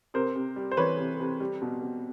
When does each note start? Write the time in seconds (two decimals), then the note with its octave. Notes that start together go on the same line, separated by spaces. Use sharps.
0.14 C3 A#4 C5
0.36 C3
0.56 G3
0.72 C5
0.77 E3 B4 C#5
0.99 C3
1.20 C3
1.40 G3
1.62 B2
1.83 B2